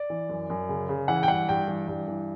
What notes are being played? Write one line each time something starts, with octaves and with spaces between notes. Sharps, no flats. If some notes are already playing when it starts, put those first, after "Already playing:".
Already playing: D5
E3
F#2
F#2
C#3
C#3
E3 F#5
G5
G2 F#5
G2 G5
E3
G2
E3